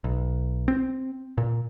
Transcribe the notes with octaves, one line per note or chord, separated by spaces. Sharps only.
B1
C4
A#2